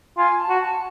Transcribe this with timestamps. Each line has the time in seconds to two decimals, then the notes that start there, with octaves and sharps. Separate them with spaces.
0.17 F4 G#5
0.39 A5
0.49 F#4
0.60 A5